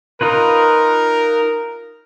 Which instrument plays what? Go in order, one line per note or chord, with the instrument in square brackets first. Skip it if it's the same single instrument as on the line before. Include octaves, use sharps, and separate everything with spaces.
[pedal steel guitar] D#4 F4 B4 [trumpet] A#4